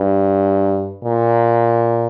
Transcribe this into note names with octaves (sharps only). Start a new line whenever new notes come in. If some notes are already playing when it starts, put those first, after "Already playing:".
Already playing: G2
A#2